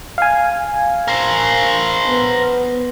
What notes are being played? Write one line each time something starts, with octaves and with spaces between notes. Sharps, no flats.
F5 G#5
A#4 C5
B3